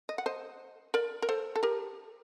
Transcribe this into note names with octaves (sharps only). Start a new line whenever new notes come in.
D#5
F#5
C5 D#5
A#4 D5
A#4
A4 C5
A4
G4 A#4